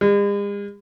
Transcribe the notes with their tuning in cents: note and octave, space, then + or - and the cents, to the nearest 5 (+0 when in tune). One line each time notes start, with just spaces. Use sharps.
G#3 -45